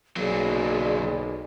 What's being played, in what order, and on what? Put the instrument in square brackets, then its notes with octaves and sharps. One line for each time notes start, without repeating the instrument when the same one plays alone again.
[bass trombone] B1 [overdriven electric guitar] F#3 A#3 [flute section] G#4 D5